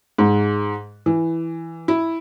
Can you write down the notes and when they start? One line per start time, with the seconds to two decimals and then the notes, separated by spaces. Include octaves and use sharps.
0.18 G#2
1.06 E3
1.88 E4